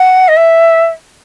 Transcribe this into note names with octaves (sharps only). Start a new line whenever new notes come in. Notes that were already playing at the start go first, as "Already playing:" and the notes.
Already playing: F#5
D#5
E5